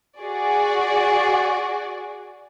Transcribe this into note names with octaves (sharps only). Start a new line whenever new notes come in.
F#4 G#4 D5